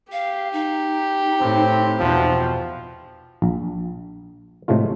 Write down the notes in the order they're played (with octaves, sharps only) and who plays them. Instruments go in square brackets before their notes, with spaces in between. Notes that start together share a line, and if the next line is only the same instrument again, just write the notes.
[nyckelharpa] G4 [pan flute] F5
[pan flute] D#4
[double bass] A2 [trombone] C4
[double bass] E2 B2 [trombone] F3
[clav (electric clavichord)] A#1
A2 C3 G#3 A3 F4